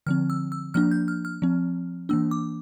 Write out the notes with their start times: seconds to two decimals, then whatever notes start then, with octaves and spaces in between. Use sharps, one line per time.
0.06 D3 F3 C4 F6
0.30 E6
0.52 E6
0.74 F3 A#3 D4 F6
0.91 G6
1.08 F6
1.25 F6
1.42 F3 C4
2.09 E3 A#3 D4 E6
2.31 D6